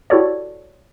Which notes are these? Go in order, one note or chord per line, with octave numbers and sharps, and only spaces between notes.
E4 F#4 G4 A4 C#5 D5